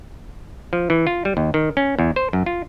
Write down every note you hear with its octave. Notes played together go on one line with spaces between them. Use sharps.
F3
E3
F4
G3
D#2
D#3
C#4
E2
C5
F#2
F4